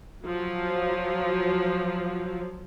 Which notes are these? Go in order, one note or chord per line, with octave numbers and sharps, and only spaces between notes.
F3 F#3